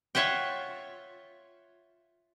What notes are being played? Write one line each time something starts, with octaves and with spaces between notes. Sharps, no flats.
F4 C#5 E5 F#5 G5